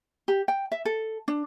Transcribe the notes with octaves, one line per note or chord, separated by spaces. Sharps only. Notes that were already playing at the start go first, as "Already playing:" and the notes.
G4
G5
E5
A4
D4